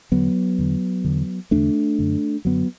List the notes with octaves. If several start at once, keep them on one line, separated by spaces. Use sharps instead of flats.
E2 D3 F#3 B3
E2 D3
E2 D3
E2 D3 A3 D4
F#2 D3
F#2 D3 F#3 B3